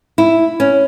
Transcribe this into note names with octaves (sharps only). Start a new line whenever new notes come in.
E4
C#4